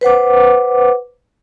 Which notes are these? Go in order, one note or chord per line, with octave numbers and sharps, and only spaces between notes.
B4 C5 F#5 D6